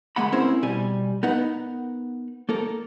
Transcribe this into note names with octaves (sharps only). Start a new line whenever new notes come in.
D2 G#3 A#3 F#5 B5
C4 C#4 E4 G#4 A#4 C5
B2 G3 G#5
B3 D#4 A#4 B4 F#5
A#3 A4 A#4